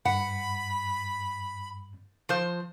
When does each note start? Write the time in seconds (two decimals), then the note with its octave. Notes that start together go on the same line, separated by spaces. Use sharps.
0.05 G2 F#5 B5
2.29 F3 C5